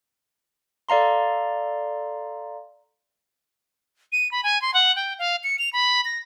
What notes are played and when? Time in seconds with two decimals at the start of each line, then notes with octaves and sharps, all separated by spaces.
0.89 A4 D5 F5 A#5 C6
4.12 D#7
4.31 B5
4.43 G#5
4.62 C6
4.74 F#5
4.96 G5
5.19 F5
5.44 C#7
5.59 F7
5.73 B5
6.05 A#6